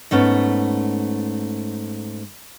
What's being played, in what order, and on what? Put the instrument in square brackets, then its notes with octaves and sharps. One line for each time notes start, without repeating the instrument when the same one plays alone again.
[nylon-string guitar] G#2 A3 B3 C#4